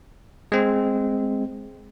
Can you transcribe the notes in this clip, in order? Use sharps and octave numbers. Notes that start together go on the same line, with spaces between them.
G#3 C4